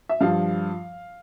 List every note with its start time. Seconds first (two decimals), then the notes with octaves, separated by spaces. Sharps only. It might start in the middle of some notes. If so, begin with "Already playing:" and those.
0.09 E5
0.21 G2 F3 F5